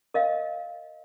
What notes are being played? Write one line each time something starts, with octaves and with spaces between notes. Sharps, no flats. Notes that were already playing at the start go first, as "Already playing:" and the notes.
A#4 D#5 F5